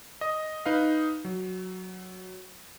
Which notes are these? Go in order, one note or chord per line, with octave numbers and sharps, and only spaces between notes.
D#5
D#4 B4 F5
F#3